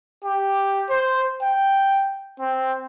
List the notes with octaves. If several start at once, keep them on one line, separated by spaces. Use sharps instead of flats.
G4
C5
G5
C4